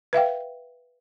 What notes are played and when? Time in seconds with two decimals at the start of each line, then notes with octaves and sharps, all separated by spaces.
0.13 B4 E5 F5 G5